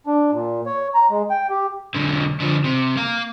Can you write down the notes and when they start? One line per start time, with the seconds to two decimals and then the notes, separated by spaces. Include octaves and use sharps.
0.06 D4
0.32 A#2
0.66 C#5
0.94 A#5
1.10 G#3
1.30 G5
1.50 G4
1.95 B1 D3
2.40 D3 F3
2.64 C3
2.97 A#3 F5